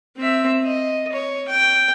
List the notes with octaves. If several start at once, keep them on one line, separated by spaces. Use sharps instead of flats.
C4 E5
D#5
C#5
G5